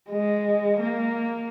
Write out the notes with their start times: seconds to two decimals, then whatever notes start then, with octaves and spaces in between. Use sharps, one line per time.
0.10 G#3
0.80 A#3